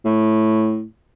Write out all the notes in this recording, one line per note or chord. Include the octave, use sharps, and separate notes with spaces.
A2